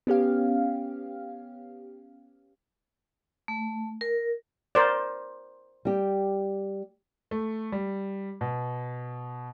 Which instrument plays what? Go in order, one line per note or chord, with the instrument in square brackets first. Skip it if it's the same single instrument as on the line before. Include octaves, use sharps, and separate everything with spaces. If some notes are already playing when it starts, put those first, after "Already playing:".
[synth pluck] B3 C#4 G4 F5
[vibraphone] A3
A#4
[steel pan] A#4 C5 D5
[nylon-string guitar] G3 G4
[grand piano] A3
G3
B2